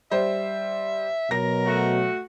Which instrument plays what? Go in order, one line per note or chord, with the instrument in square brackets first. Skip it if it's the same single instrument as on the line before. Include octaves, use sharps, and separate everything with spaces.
[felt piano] G3 C5 [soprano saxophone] E5
[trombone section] B2 F#3 [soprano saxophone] A#4 [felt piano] A#6
[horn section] A3 F#4